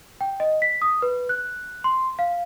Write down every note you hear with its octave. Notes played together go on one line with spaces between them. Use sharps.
G5
D#5
B6
D#6
B4
F#6
C6
F5